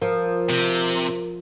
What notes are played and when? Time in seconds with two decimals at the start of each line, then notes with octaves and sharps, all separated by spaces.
0.02 F3 A#4
0.50 C3